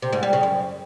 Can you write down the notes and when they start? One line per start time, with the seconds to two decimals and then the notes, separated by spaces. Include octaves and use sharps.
0.02 C3
0.13 G#2
0.23 G3
0.33 C#3
0.43 F#2